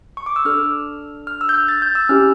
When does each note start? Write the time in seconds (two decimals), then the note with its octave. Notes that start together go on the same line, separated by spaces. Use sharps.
0.17 C#6
0.26 D6
0.36 E6
0.45 D4 A4 F6
1.27 F6
1.41 E6
1.49 G6
1.54 F6
1.69 A6
1.82 G6
1.95 E6
2.09 C#4 E4 G4 F6